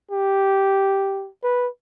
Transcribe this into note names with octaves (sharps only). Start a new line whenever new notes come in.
G4
B4